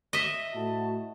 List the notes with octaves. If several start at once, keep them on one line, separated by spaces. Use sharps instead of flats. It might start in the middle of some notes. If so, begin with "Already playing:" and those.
D#5 E5
A2 F#4 A5